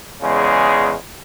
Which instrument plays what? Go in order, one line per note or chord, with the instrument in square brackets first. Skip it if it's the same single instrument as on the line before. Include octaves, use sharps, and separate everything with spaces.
[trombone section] E2 C#3 G#3